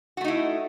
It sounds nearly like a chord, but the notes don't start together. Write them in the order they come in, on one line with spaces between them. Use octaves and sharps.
F#4 A3 D#4 E4